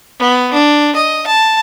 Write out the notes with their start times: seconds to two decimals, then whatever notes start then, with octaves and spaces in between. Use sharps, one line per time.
0.19 B3
0.53 D4
0.96 D#5
1.27 A5